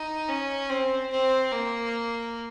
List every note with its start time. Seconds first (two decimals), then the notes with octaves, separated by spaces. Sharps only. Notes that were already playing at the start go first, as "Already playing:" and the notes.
Already playing: D#4
0.29 C#4
0.69 C4
1.11 C4
1.52 A#3